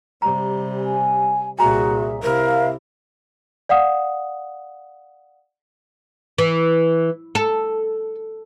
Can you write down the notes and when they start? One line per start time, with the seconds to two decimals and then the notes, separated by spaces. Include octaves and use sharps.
0.22 C3 G3 A#5
0.78 G#5
1.59 C2 A#2 F#4 G#4 E5 G#5 A#5
2.23 C3 E4 A#4 E5 F5
3.69 D5 F5 F#5 D#6
6.38 E3
7.35 A4